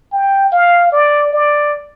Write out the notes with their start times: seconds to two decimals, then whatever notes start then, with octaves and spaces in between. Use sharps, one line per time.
0.12 G5
0.52 F5
0.92 D5
1.33 D5